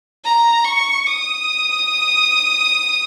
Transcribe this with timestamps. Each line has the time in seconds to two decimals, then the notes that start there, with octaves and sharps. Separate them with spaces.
0.25 A#5
0.65 C#6
1.07 D#6